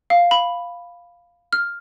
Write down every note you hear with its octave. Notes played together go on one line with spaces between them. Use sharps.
F5
B5
F6